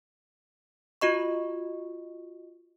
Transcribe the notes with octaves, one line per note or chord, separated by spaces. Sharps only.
F4 F#4 D#5 C#6